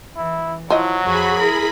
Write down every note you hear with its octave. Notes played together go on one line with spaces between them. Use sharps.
E3 E4
F3 F#3 E4 D#5
F2 F#4 G#4 B5
E4 A#4